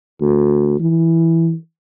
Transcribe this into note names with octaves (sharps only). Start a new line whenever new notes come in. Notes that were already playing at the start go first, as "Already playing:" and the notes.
D2
E3